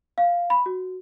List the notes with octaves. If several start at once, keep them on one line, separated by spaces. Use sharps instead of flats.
F5
B5
F#4